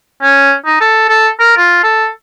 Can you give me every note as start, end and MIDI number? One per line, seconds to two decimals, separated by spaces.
0.22 0.53 61
0.65 0.77 63
0.81 1.07 69
1.09 1.29 69
1.40 1.53 70
1.57 1.80 65
1.83 2.08 69